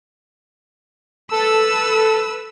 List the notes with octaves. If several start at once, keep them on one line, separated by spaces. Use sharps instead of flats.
A4 B4 E6